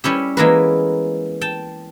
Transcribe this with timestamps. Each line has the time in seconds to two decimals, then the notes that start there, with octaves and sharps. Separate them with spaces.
0.04 G3 C#4 E4 G4
0.37 E3 G#3 A#3 B3 A#4 B4
1.41 G5 A5